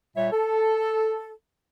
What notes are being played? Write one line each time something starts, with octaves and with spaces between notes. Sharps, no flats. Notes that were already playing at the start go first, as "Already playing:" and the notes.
A#2 G3 C#5 E5
A4